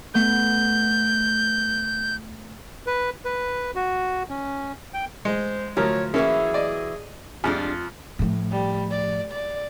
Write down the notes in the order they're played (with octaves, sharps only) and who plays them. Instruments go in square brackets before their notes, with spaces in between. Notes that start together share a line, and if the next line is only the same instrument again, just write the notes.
[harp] A3 B3 [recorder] G6
[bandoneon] B4
B4
F#4
C#4
G5
[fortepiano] G#3 [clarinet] C5
[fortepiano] D2 F#3 A#4 [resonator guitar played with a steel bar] F3 [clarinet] C#5
[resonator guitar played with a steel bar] E3 F#3 E4 [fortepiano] A#3 C#4 [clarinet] G#4
[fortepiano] D5 D#5
[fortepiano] F2 [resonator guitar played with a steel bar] G3 G#3 D4 [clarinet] F4
[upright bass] A2 F3
[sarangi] G3
D5
D5